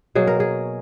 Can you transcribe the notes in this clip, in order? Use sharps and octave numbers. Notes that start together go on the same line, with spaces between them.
B2 F#3 A#3 G#4
A#4
G#4